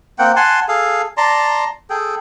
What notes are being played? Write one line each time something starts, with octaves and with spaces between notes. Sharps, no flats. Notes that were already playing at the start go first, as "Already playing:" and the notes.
A#3 C4 F#5 G5
F#5 G#5 A5 C6
G#4 A4 F5
D5 A5 A#5 C6
G#4 A4 G5